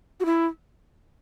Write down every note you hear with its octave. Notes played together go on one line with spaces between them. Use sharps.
F#4
E4